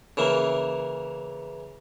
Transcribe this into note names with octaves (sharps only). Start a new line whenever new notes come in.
C#3 E3 A#3